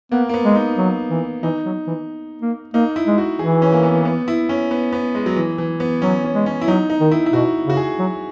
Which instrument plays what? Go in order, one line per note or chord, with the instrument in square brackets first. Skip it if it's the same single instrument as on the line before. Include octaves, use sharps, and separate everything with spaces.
[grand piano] A#3 [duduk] B3
[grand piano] A#3
B3
[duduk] G#3
[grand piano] D#4
[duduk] F#3
E3
[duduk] E3 [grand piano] D#4
[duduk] F#3
E3
A#3
[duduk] A#3 [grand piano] D#4
[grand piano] E4
[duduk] G#3
[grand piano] F#4
[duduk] E3 [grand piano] G#4
[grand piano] C#4
A#3
B3
B3
E4
C#4
B3
B3
G#3
F#3
E3
E3
B3
[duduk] F#3 [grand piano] C#4
[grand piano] C#4
[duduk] G#3
[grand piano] C#4
E4
[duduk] F#3 [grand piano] D#4
[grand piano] D#4
[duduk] D#3
[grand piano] E4
E4
[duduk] B2 [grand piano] F#4
[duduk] C#3 [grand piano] F#4
[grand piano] G#4
[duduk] F#3